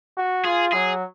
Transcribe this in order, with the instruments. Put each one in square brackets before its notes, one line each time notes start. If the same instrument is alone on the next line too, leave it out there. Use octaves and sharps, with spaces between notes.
[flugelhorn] F#4
[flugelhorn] F4 [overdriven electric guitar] G#4
[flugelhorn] F#3 [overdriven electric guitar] G#4